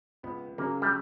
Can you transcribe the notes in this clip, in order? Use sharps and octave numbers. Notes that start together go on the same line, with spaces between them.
C#2 B3
C#3 F#3 A#3 C#4
G3